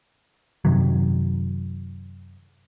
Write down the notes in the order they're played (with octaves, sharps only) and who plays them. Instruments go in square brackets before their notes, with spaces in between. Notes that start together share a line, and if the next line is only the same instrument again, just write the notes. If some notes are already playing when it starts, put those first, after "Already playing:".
[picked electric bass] F#2 C3 D#3 F#3